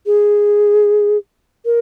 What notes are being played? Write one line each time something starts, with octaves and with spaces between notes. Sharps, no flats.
G#4
A#4